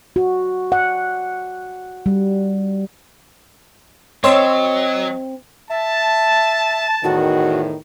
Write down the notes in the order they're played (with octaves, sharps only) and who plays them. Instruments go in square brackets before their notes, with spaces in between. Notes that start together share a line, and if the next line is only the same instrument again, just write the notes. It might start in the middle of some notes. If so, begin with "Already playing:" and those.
[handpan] F#4
F#5
G3
[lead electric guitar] F#3 [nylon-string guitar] C4 [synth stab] C#5 C6 E6 [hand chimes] D#5
[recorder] E5 [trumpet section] A5
[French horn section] E2 A2 D#3 [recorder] F#4